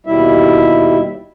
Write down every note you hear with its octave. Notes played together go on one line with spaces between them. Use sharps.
D#2 B2 G3 E4 E5